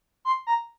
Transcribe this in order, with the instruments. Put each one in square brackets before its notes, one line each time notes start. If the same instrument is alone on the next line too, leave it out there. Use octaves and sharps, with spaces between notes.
[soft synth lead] C6
A#5